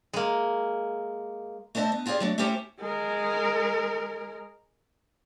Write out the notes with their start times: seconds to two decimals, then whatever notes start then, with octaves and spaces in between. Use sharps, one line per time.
0.13 G#3 A#3
1.75 A3 D4 C5 D#5 E5
1.92 B3
2.06 C4 F4 G4 G#4 D5
2.20 F#3 A3 D4
2.38 A3 C#4 E4 G4 A4 C5
2.80 G#3 A#4